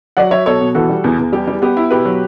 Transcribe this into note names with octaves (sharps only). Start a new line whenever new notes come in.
F#3 D5 F#5
F#3 C#5 E5
B2 A4 C#5
B2
E3 F#4 A4
G3
E2
E2
G3 G4
G3
B3 G4
E4
B2 G4 B4
F#3